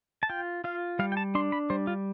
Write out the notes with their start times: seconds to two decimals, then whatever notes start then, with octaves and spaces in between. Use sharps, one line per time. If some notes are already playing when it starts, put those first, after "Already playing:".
0.23 A5
0.29 F4 G5
0.64 F4 F5
0.99 G3 F5
1.12 G5
1.17 A5
1.35 D4 C6
1.52 B5
1.70 G3 C5
1.87 F4